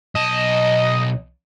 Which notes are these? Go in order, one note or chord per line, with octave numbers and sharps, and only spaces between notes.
B1 D#5 A5